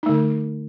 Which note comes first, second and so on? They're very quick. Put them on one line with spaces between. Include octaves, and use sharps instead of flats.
D#4 A3 D3